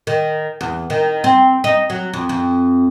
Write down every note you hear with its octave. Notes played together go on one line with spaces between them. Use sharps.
D#3
E2
D#3
C4
D#4
F#3
F2
F2